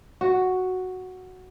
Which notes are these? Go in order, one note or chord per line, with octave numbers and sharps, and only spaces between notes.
F#4